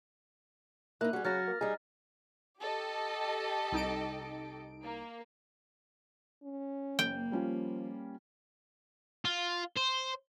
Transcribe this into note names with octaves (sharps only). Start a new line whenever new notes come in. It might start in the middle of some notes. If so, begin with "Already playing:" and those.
A#3 D#4 E4 F#6
G3 F#4 G#4
C#3 F#3 F#4 F6 A6 A#6
A#3
G3 D#4 G#4
G4 A4 D#5
C2 D#4 D7
A#3
C#4
F#1 A#3 G5
F3 G3 C#4 F4
F4
C5